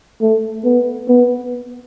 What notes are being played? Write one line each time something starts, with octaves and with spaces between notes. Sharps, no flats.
A3
B3
B3